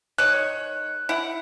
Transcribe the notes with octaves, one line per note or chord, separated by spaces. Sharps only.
D#3 C#5 F#6
E4 F#5